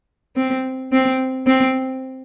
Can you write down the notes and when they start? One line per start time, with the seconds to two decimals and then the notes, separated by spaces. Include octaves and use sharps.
0.36 C4
0.92 C4
1.47 C4